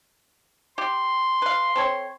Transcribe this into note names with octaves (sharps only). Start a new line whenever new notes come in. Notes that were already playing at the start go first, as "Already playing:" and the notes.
G4 C6
B4 F5
C4 A4 C#5